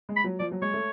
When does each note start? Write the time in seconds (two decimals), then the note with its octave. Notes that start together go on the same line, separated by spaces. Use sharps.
0.09 G#3
0.16 B5
0.24 F#3
0.39 F3 D5
0.52 F#3
0.62 G#3 C#5
0.74 A3